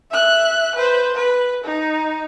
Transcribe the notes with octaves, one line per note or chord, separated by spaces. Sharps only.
E5 F#6
B4 C5
B4
D#4